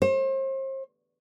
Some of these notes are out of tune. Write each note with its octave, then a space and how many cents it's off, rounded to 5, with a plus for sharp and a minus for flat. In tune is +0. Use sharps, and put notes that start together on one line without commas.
C5 +40